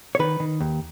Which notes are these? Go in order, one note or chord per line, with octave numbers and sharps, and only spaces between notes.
C#5
D#3 B4
D#3
D#2